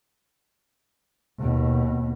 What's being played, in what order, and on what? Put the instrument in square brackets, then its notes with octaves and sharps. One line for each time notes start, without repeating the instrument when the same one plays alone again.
[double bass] D#2 B2